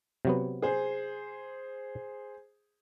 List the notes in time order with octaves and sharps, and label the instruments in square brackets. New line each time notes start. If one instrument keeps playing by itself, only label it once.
[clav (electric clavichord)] C3 F#3 B3
[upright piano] G#4 C5